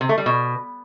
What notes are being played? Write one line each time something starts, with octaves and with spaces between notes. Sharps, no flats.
C3
A3
G3
B2